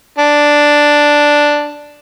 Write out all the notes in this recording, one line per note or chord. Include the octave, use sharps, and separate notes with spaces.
D4